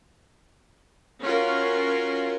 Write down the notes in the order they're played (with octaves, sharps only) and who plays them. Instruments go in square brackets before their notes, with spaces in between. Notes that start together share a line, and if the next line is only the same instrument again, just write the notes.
[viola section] C#4 F4 F#4 A#4